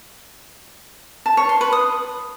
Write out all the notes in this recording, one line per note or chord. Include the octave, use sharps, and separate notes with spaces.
A5
C#5
C6
B4
D#6